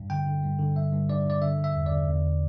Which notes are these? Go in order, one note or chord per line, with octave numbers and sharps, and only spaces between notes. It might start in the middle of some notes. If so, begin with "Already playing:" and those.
Already playing: G2
D3 G5
D3
G2
D3
G2 E5
G2
G2 D5
G2 D5
D3 E5
D3
E5
E2
D5
D3
E2